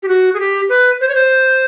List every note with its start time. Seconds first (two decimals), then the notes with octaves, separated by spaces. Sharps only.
0.03 G4
0.08 F#4
0.34 G#4
0.40 G4
0.69 B4
1.01 C5
1.09 C#5
1.15 C5